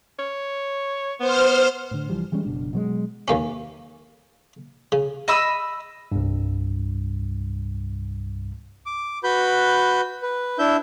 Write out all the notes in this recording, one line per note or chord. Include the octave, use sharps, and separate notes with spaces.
C#5
B3 C5 F6
A2 D3
C2 E3 F3 G3
E3 G3 G#3 C#4
F#1 B2 D4
B2 F#3 G#3
D#2 A#3 C#4
C#3
D#5 B5 E6
C2 G2
D6
F#4 B4 B5 G6
B4
D4 E4 E5 G6